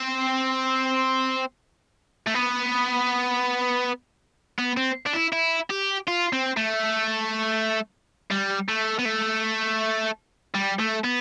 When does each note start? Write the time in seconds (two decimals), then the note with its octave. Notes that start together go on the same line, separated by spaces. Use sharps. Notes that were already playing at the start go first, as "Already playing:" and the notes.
Already playing: C4
2.27 A3
2.34 B3
4.59 B3
4.77 C4
5.06 D4
5.13 E4
5.33 E4
5.70 G4
6.07 F4
6.33 C4
6.57 A3
8.31 G3
8.69 A3
8.99 B3
9.05 A3
10.54 G3
10.79 A3
11.04 B3